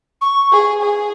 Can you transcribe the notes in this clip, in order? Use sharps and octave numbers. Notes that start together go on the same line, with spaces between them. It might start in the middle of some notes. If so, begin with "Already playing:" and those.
C#6
G#4
G#4